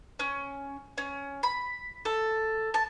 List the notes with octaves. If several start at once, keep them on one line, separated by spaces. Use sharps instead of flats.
C#4
C#4
B5
A4
A5